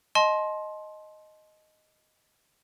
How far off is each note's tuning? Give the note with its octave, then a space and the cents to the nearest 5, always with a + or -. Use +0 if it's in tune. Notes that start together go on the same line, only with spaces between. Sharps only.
D#5 +0 A5 -35 C6 +15